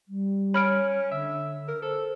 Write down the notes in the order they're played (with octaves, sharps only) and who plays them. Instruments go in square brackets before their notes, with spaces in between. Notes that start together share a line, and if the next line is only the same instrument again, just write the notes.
[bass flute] G3
[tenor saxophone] C#4 [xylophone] B5 F6 D7
[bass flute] D3 [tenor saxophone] E5
[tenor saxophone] A#4
[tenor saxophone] A4 [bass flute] C5